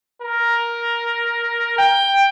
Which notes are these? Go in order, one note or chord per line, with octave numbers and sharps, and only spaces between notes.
A#4
G5